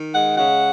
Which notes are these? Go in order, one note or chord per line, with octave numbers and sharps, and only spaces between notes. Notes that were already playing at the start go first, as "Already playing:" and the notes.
Already playing: D#3
G#3 F#5
C#3 F#5